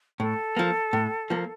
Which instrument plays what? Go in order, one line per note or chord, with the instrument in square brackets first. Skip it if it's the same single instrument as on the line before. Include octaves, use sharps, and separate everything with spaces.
[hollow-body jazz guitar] A2 [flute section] A4
[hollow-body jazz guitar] F3 A#3
A2
F3 A#3